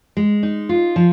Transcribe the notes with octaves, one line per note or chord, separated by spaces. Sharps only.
G#3
D#4
F4
F3